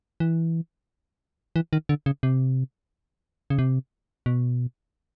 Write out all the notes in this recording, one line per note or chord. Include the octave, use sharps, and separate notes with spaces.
E3
E3
D#3
D3
C#3
C3
C#3
C3
B2